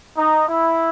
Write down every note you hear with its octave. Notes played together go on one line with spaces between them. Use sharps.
D#4
E4